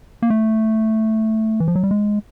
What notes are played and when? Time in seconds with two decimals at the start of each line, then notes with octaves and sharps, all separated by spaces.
0.22 A#3
0.30 A3
1.60 E3
1.68 F3
1.75 F#3
1.83 G3
1.91 G#3